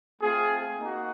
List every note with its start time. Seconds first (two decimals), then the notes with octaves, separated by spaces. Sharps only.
0.20 A3 C4 F4 G#4
0.78 A#3 D#4 F#4